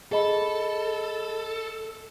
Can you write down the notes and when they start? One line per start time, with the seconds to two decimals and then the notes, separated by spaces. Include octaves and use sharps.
0.12 G#4 A4 D#5 B5